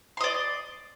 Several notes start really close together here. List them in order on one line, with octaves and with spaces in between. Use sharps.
C6 D#5 D5